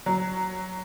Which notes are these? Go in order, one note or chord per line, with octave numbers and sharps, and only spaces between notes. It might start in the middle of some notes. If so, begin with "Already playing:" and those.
F#3